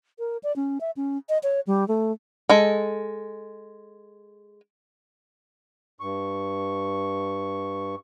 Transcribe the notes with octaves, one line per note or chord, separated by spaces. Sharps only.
A#4
D5
C#4
E5
C#4
D#5
C#5
G3
A3
G#3 A4
G2 C#6